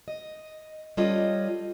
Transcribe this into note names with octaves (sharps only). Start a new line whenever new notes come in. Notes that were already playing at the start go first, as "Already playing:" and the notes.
D#5
G3 C#4 F4 A4 D#5